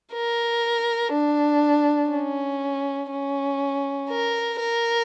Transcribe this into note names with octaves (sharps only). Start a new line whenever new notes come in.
A#4
D4
C#4
C#4
A#4
A#4